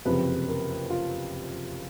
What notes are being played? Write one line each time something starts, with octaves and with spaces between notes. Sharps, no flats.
F#1 F2 C3 F3 B4
A#4
F4